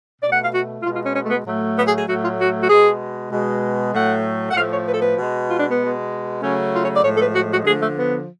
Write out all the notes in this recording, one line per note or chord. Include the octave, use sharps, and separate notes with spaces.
B2 A3 D5
F#5
F5
F#4
B2 G#3 F4
F4
C#4
C#4
A3
B3
A2 F#3 A3
B3
G#4
G#4
A2 F#3 A3 F#4
F4
F#4
F#4
B2 G#3 G#4
B2 G#3
A2 F#3 A3 F#5
F#5
A2 F3 A3 F5
C#5
B4
A4
B4
B2 G#3
F4
D4
B3
B2 G#3
C#3 F#3 A3 C#4
F4
C#5
D5
A2 F3 G#3 C#5
A4
B4
F#4
F#4
D3 F3 A3 G#4
A3
B3